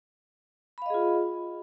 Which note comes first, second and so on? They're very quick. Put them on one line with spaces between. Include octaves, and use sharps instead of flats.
B5 F5 D#5 G#4 F4